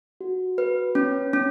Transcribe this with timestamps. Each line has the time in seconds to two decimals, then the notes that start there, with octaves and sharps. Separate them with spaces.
0.21 F#4
0.58 B4
0.95 C#4
1.33 C#4